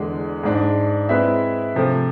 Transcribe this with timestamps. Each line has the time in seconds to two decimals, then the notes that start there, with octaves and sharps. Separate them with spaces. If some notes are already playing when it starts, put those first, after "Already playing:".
Already playing: E2 D3 G#3
0.43 G#2 G#3 D4
1.09 G#3 C4 E4 B4 E5
1.75 C3 F3 A3